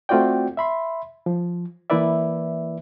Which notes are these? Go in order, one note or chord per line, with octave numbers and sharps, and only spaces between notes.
A3 C4 F4 F#4 D5 G5
E5 B5 C6
F3
E3 A#3 E4 B4 D5 E5